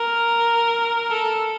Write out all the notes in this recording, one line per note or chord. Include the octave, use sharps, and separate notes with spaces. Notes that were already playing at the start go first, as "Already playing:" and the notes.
Already playing: A#4
A4